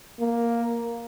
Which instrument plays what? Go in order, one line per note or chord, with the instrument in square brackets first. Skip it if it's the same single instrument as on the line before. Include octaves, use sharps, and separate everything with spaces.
[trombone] A#3